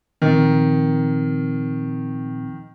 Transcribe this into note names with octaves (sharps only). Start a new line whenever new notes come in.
A#2 D#3 F3 C4